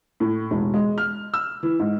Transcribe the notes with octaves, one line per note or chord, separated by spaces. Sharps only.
A2
E1
G#3
F6
E6
E3
G#2